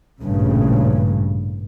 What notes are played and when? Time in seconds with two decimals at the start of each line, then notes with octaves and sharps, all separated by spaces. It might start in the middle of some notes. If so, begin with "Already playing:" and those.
0.21 A1 G2 A#2 C#3